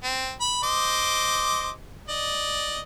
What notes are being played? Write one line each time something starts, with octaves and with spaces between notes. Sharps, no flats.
C4
B5
C5 D#5 D6
D5 D#5